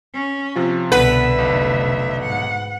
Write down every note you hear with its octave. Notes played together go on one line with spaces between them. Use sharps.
C#4
C3 F3 F4
C2 B2 D3 B3 B4 E5 F#5
F1 B1 C3
G#2 F#5